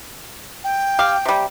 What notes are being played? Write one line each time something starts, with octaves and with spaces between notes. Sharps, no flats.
G5
G4 F5
C3 G3